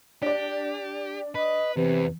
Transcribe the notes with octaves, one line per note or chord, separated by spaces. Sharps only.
D4 G4 D5
B4 D#5
E2 C3 B4